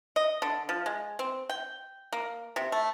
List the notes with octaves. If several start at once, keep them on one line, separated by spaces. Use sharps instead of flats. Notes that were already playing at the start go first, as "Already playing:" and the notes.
D#5
D3
F3
G#3
C4
G5
A#3
C3
A3